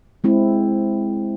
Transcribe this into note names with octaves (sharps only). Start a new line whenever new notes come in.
G#3 C4 E4